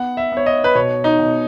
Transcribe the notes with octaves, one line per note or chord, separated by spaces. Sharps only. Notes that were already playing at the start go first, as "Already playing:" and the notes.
Already playing: B3 F#5
E5
B3 C#5
D#5
B4
B2 C#5
D#4
B2